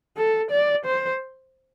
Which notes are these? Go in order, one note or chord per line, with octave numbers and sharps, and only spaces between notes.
A4
D5
C5